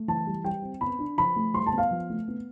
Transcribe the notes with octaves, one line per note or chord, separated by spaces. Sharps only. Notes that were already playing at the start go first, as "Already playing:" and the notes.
Already playing: A3
E3 A5
G3
G3 G5
C4
B3 B5
D4
F3 B5
A3
G3 C6
A5
B3
F5
F3
A3
B3